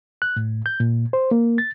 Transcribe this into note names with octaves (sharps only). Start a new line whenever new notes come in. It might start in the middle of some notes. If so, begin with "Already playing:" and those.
F#6
A2
G6
A#2
C5
A#3
A6